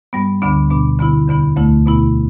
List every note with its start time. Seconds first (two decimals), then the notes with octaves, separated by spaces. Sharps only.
0.13 G2 G3 B3
0.42 D2 D3 B3 D4
0.70 B2 B3 D4
0.99 D3 B3 E4
1.28 E2 D3 B3 E4
1.57 D2 D3 A3 E4
1.86 B2 B3 E4